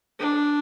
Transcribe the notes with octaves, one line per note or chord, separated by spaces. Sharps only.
D4